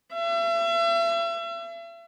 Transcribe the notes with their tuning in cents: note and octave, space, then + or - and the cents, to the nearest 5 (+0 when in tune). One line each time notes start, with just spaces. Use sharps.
E5 +40